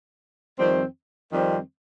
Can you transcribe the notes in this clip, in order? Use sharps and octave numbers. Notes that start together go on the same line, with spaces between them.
F2 D#3 G3 C4
F2 D#3 G3 C4